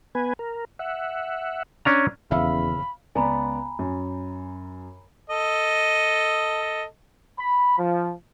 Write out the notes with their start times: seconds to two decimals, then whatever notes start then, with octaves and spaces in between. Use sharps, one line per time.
0.15 B3 B4 G#5
0.39 A#4
0.79 E5 F#5
1.85 C#4 D4 A#5
2.31 D#1 E2 C#3 C#4 E5 F5 B5
3.15 C#2 B3 D5 G#5 A#5 B5
3.79 F#2
5.30 A4 D#5
7.39 B5
7.78 F3